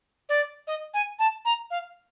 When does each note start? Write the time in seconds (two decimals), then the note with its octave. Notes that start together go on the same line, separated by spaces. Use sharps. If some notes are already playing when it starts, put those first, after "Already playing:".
0.29 D5
0.67 D#5
0.94 G#5
1.19 A5
1.45 A#5
1.71 F5